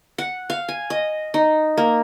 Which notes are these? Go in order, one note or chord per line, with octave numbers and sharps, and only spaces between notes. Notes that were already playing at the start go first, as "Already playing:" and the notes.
F#5
F5
G#5
D#5
D#4
A#3